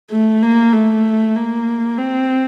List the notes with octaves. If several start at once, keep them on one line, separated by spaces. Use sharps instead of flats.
A3
A#3
A3
A#3
C4